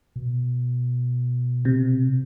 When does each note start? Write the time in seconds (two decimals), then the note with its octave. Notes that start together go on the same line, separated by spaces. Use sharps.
0.16 B2
1.65 C3